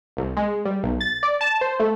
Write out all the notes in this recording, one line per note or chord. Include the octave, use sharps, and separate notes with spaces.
C2
G#3
G3
B1
A6
D5
A5
C5
A3